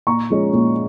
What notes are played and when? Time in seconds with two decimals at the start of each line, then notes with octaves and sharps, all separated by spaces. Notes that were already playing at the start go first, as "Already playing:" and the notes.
0.07 A#2 A#5 C#6
0.30 F3 G#3 C#4
0.53 A#2